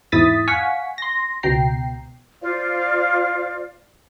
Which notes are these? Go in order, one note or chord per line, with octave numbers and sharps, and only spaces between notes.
E2 G#2 E4 D#6 A6 B6
F5 F#5 G#5 C#6 B6
C6 A#6
C#2 B2 G5 A#5 C7
F4 C5 D5 F5